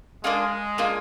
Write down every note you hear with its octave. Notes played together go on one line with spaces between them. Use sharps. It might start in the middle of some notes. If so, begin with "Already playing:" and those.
G#3 A#3 D4 F4 G#4
A#3 D4 F4 G#4